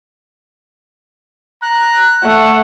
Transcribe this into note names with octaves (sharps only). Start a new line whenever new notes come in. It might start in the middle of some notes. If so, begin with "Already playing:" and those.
A#5 F#6
A3 F#5